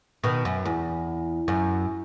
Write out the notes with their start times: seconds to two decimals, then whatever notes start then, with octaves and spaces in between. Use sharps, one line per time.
0.24 B2 D#3
0.45 F#2
0.65 E2
1.48 F#2